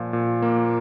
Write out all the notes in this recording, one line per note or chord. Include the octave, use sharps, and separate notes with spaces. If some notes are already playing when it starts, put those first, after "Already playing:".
Already playing: A#2 F3
A#2
A#3